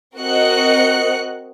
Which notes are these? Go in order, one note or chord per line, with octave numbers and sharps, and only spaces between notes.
C4 F#4 A#4 D#5 F#6 C#7